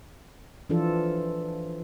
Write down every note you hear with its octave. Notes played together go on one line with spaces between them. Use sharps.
E3 F3 D4 F4 A4